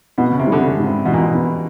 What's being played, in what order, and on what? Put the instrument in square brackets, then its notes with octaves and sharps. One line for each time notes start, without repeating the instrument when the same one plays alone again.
[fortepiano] B2 [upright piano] B3
[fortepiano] C#3
C3
[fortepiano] D3 [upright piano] G3
[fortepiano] C#3
[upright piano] G#2
[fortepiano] C3
[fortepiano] B2 [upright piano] E3
[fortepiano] A#2
B2
[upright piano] B3